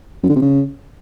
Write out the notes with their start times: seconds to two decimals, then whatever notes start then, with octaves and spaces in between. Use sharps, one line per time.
0.23 F#2
0.30 D3
0.36 C3
0.42 C#3